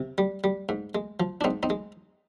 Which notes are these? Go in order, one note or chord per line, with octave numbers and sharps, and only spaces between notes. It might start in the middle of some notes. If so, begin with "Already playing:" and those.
Already playing: C3
G3
G3
G#2
G#3
F3
D4
G#2 C4 D#4
C4 D#4
G#3